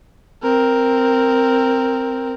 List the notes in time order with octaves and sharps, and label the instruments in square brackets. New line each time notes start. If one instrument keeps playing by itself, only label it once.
[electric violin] C4 A#4